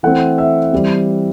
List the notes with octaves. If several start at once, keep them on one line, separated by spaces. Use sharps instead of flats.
E3 A3 C4 F#5
E5
E3 G3 C4